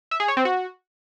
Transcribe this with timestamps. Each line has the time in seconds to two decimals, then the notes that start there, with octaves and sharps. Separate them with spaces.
0.11 E5
0.20 G#4
0.28 C#5
0.37 C4
0.45 F#4